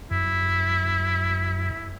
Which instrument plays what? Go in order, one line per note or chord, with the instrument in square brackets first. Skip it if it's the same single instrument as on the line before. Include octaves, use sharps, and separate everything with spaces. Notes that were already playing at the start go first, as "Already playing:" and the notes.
[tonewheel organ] F#2 [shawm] E4